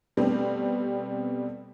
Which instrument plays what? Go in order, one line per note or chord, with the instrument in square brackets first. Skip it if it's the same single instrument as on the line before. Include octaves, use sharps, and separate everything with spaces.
[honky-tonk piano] B2 G3 A3 B3 C4